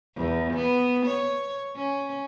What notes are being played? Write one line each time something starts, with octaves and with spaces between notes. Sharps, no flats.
E2
B3
C#5
C#4